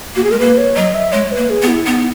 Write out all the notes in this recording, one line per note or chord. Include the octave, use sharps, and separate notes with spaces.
A#3 F#4
G#4
G#3 A#4
A#3 B4
C#5
F#3 D#5
E5
G#3 C#5
B4
A#3
G#4
B3
E4
B3 D#4